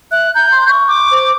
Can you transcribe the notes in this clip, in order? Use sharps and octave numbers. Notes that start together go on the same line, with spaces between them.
E5 F#6
A#5 G6
C6
C#6
D6
C5